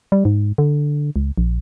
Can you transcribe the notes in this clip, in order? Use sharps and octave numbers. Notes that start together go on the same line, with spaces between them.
G3
G#2
D3
C#2
A#1